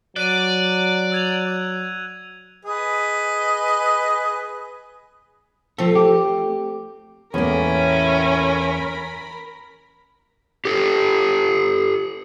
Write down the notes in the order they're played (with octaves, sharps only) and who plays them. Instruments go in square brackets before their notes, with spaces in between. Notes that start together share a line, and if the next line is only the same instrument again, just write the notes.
[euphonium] F#3 [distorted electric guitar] D5 [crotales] F#6 D#7
[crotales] E6 G#6 F7
[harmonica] G#4 B4 D#5
[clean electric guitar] F3 A4 [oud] A3 C4
[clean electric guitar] G4
[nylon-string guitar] E2 A#3 [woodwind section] A2 [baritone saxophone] C#4 [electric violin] A#4 B5
[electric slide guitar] G4 A4